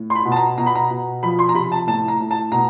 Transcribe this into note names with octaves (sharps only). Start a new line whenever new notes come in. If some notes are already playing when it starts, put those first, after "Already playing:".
Already playing: A2
C6
B5
B2
A5
A#5
B2 A#5
B5
A#5
B2
F3 B5
C6
A#5
C3 B5
A5
A2 A5
A#5
A2
A5
B2 A#5